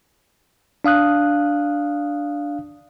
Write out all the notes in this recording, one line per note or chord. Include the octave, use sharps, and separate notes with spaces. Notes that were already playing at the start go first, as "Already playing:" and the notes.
D4 F5 D#6 F#6